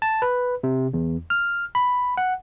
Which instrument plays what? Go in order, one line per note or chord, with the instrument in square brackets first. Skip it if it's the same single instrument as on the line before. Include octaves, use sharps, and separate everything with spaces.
[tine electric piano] A5
B4
C3
E2
F6
B5
F#5